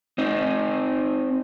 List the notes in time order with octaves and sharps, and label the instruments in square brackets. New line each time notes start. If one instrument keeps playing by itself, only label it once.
[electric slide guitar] C4 D#4